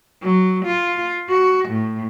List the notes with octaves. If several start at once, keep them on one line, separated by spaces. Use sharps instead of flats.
F#3
F4
F#4
A2